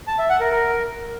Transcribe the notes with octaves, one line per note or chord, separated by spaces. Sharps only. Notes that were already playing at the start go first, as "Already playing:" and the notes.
A5
E5
F#5
A#4
A#4